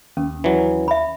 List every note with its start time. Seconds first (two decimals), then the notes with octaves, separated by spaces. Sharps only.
0.17 D#2 C#4
0.44 E3 F#3
0.88 E5 B5